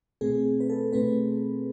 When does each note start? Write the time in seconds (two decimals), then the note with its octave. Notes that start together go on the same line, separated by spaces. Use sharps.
0.21 B2 A3 C4 G#4
0.60 B4
0.70 A4
0.93 B2 A3 C4 B4